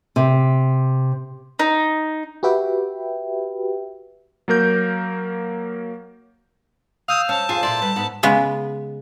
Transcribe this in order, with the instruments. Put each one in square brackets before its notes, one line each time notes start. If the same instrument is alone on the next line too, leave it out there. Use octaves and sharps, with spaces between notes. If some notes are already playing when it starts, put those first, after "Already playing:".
[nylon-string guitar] C3
[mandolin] D#4
[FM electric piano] F#4 G4 B4 E5 G5
[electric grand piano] F#3 A#3 A#4 G6
[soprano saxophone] F5 [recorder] D#6 [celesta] E6 G6 E7
[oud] C#4 [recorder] A5
[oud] F2 F4 G#4 [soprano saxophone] G#5
[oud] A#2 E4 C5 [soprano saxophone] D5
[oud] G3 [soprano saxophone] B4
[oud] G#2 [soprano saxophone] B3
[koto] C#3 G#3 B3